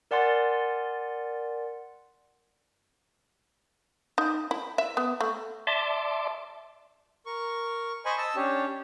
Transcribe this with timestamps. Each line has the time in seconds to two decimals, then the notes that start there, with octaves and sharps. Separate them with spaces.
0.11 A#4 D5 F#5 G#5 C6 A6
4.18 D#4
4.51 E4
4.78 E5
4.97 B3
5.21 A3
5.67 D5 E5 A5 C6 D6
7.26 A#4 C#6
8.05 C5 D#5 G#5 B5 C#6
8.18 D#5 A5 E6
8.36 C#4 D4 G4 C#5